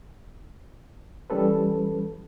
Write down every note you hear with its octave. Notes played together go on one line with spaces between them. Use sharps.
E3 G3 C#4 A4 B4